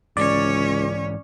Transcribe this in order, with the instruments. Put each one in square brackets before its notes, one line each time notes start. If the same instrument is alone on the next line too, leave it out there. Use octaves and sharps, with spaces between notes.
[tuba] C#2 [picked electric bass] G#2 E3 [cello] C#4 C#5 [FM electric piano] D5